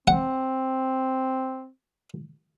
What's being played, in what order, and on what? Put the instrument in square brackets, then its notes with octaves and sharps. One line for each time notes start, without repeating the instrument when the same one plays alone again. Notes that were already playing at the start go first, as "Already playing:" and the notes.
[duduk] C4 [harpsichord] F#5